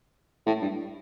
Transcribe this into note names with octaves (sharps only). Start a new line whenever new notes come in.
A2
G2